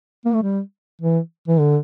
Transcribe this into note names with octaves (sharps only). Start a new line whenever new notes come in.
A#3
A3
G3
E3
E3
D3